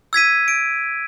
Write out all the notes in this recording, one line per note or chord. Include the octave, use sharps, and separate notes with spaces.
E6 G#6 B6 D#7
D7